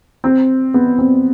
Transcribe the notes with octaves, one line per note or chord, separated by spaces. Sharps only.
C4
B3
C4